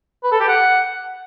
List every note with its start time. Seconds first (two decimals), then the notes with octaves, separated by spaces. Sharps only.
0.24 B4
0.32 A4
0.40 G4
0.48 F#5